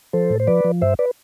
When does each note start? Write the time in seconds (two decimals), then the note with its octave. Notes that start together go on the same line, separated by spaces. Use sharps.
0.13 F3 A4 C5
0.30 A2
0.40 C5
0.47 F3 B4 D5
0.65 F3
0.82 G2 C5 E5
0.99 B4 D5